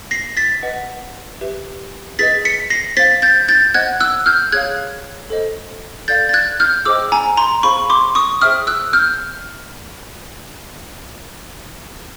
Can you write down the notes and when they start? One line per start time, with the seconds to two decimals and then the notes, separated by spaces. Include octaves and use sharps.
0.11 A#6 C7
0.37 A6 B6
0.63 B4 D#5 F#5
1.41 G4 B4 E5
2.19 G#4 B4 D#5 A6 B6
2.45 B6 C#7
2.70 A#6 C7
2.97 C5 F5 A6 B6
3.22 G6 A6
3.48 G6 A6
3.74 C5 D#5 F#5 F#6 G#6
4.00 E6 F#6
4.26 F6 G6
4.52 G#4 C#5 F5 F#6 G#6
5.30 A4 C5 D#5
6.08 A4 D5 F5 G6 A6
6.29 A6
6.33 F#6 G#6
6.60 F6 G6
6.85 G#4 C5 D#5 G5 D6 E6
7.12 G#5 A#5
7.37 A#5 C6
7.63 G#4 C5 F5 B5 C#6
7.90 C6 D6
8.15 C#6 D#6
8.41 G#4 C5 E5 G5 D#6 F6
8.67 E6 F#6
8.93 F6 G6